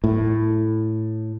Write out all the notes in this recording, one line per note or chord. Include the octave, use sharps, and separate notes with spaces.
A2